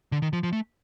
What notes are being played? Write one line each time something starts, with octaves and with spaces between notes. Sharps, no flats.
D3
D#3
F3
F3
A3